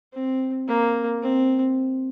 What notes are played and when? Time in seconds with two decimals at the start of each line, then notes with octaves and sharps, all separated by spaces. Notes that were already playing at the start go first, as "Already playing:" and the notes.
0.13 C4
0.68 A#3
1.22 C4